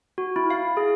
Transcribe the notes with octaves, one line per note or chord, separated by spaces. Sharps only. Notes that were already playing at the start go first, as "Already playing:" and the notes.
F#4
E4
F5
G#4